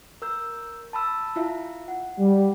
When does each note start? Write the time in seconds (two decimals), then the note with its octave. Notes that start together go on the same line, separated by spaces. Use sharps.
0.22 A#4 E6 G6
0.93 A5 B5 E6
1.36 E4 F4 E5
1.88 F#5
2.19 G3